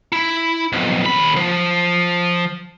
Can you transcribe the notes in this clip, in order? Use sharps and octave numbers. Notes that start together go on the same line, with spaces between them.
E4
B1 F2
D#2 B5
F3